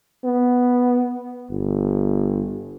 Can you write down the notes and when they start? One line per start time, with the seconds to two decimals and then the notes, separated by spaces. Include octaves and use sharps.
0.24 B3
1.51 G1